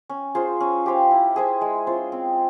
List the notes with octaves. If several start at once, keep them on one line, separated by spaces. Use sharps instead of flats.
C#4
F4 G#4 C5
C#4
G4 C5 F5
E4
G#4 C5 E5
G#3
C#4 F4 C5
C4